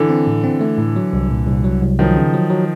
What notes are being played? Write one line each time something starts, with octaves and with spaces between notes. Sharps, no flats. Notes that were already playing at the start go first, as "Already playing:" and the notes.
Already playing: D3 E3
C4
A2
C4
A3
A2
F#3
C2
A#2
C2
F#3
C2
D#3 F3 F#3
C#3
F#3
F#3